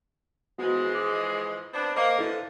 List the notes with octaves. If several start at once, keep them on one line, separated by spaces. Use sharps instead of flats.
E3 F3 G#3 B3 F#4
D6
B3 C4 D4
A#3 C5 D#5 F5
D3 E3 F3 E4 A4